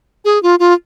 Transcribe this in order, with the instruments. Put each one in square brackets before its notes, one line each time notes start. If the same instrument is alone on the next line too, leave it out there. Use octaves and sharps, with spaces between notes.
[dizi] G#4
F4
F4